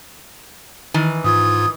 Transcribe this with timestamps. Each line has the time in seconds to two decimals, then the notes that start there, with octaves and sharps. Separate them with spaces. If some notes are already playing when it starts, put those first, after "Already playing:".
0.94 D#3 E3 G#5
1.24 G#2 F4 D#6 G#6